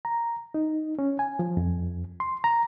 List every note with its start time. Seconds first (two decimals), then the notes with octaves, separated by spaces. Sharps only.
0.05 A#5
0.54 D#4
0.99 C#4
1.19 G#5
1.39 F3
1.57 F2
2.20 C6
2.44 A#5